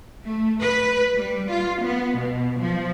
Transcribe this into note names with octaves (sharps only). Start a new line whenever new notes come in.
A3
B4
G3
F4
B3
B2
F3